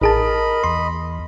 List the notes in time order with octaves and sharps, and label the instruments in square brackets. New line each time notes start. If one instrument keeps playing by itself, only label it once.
[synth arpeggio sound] A1 G#4 A5 [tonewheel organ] A#4 [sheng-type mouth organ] D#5 B5
[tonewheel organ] E2 [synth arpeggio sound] C6